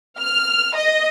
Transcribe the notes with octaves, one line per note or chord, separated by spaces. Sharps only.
F6
D#5